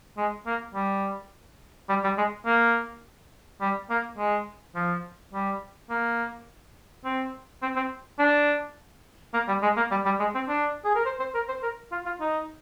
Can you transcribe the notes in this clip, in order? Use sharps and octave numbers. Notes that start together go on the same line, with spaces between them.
G#3
A#3
G3
G3
G3
G#3
A#3
G3
A#3
G#3
F3
G3
A#3
C4
C4
C4
D4
A#3
G3
G#3
A#3
G3
G3
G#3
C4
D4
G#4
A#4
C5
C5
A#4
C5
A#4
F4
F4
D#4